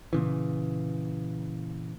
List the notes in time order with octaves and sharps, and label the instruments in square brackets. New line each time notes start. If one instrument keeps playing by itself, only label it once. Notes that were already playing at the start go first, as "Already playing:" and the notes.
[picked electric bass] A#2 C#3 E3